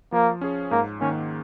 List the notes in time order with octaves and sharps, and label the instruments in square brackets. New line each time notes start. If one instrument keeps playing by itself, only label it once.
[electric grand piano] F3 [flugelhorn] A#3
[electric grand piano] C#4 G#4 C#5
[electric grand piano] G#2 [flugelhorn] A#3
[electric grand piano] D#3 A#3 [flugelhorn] C#4